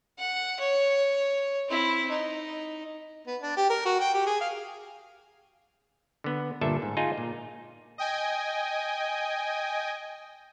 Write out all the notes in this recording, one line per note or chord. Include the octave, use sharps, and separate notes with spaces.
F#5
C#5
C4 E4
D#4
B3
D4
G4
A#4
F#4
G5
G4
G#4
F5
D3 B3
G1 A#2 D4 A4 E5 A5
G#2
D#4 F4 G#4 D#5 G#5 A#5
A#2
D#5 G5 G#5